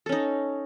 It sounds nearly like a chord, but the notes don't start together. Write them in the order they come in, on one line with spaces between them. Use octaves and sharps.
A4 C#4 D#4